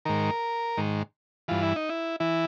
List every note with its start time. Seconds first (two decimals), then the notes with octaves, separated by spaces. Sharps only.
0.05 G#2 D#3 A#4
0.77 G#2 D#3
1.48 G2 E3 F4
1.63 E4
1.76 D#4
1.89 E4
2.20 E3 E4